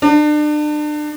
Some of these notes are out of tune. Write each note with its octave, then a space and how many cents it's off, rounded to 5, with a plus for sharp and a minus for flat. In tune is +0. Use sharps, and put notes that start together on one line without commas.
D4 +35